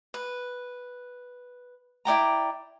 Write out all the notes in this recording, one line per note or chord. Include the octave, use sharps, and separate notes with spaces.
B4
E4 D5 G5 A#5